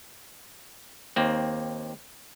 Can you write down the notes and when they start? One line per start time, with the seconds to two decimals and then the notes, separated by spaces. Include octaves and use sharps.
1.16 D#2 A#3 C4